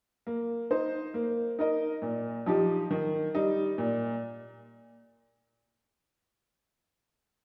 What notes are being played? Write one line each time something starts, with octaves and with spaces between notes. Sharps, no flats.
A#3
D#4 C5
A#3
D#4 A#4 D#5
A#2
F3 D#4 G4
D#3
G3 D#4
A#2